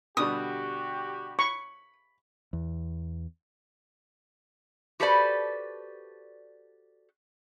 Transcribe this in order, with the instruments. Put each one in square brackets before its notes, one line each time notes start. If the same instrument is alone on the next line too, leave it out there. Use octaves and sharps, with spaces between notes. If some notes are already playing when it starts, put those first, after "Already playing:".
[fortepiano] B2 D3 G3 [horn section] F#4 G4 [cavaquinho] D#6
[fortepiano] B5 [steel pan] C#6
[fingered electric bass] E2
[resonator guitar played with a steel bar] F#4 G4 A4 B4 C5 D5